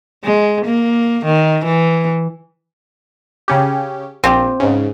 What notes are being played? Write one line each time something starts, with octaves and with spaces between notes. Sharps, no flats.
G#3
A#3
D#3
E3
C#3 C#4 G4
A#1 C4 F4 G4
G#2 C#3